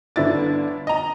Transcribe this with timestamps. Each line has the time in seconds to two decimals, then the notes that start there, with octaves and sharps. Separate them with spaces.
0.16 G1 D3 E4 D5 A6
0.87 D#5 A#5